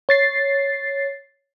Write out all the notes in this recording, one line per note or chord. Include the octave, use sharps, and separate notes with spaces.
C#5 A6 C7